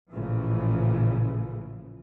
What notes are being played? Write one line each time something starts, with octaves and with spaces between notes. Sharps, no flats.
A1 A#2 C#3 E3 F3